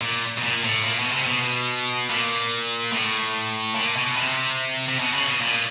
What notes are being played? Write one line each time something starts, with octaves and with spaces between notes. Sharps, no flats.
A#2
B2
A#2
A2
A#2
B2
C3
B2
A#2
A2
A#2
B2
C3
C3
B2
C#3
B2
A#2